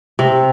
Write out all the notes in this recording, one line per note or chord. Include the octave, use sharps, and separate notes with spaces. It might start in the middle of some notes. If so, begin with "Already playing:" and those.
C3